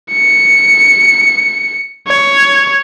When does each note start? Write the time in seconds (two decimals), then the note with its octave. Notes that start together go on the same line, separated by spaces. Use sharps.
0.12 C#7
2.08 C#5